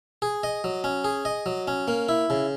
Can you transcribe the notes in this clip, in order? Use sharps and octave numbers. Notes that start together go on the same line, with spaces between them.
G#4
D#5
F#3
C#4
G#4
D#5
F#3
C#4
A#3
E4
C#3